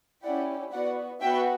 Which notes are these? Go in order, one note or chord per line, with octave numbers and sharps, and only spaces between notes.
C#4 E4 G4 D5 F#5
B3 F#4 D5 F#5
B3 F#4 E5 G5